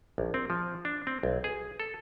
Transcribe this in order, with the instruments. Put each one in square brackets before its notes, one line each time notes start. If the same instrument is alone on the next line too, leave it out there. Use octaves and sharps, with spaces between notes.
[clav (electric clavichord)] A#1
C4
F3
D4
C4
B1
G#4
A4